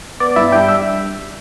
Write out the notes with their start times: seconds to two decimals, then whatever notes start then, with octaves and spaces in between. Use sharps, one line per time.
0.20 B3 D5
0.36 G2 E4 E5
0.52 D4 G4 G5
0.68 G3 E5